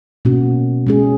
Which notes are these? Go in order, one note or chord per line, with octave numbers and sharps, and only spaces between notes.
B2 A#3 C#4 F#4
G#3 C#4 G#4